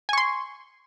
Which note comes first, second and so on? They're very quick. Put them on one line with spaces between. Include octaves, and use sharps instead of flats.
G#5 C#6 C6